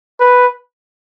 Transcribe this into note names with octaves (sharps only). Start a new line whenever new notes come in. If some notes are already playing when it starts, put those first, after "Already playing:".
B4